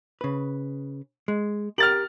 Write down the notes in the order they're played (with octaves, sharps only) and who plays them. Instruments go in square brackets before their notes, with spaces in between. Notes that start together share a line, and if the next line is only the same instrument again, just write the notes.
[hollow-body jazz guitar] C#3 B4
G#3
[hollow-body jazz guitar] G4 A#4 [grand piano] F6 A6 F#7